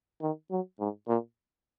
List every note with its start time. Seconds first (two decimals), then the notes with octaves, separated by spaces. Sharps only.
0.21 D#3
0.51 F#3
0.80 G#2
1.08 A#2